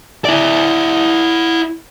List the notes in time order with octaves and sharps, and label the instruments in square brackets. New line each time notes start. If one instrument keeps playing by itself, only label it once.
[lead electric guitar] E4 D5